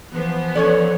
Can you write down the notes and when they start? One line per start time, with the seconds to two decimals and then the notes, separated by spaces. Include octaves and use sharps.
0.13 E3 F3 B3
0.55 C#4 A4 C#5 D5